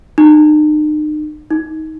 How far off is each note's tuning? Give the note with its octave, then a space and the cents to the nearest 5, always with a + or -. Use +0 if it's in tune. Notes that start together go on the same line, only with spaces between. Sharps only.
D#4 -40
D#4 +25